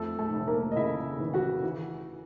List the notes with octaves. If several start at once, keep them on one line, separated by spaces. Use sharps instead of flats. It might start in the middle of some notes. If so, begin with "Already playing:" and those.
Already playing: F2 A3 A4
A3 A4
F1
A#3 A#4
D#5
C#3 E4 E5
E3
F#4 F#5
E3